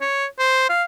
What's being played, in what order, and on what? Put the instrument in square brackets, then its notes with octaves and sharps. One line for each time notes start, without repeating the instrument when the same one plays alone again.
[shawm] C#5
C5
F5